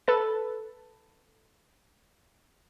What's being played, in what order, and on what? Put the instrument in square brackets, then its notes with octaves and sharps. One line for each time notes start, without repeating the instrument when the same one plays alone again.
[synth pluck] A4 B4 A6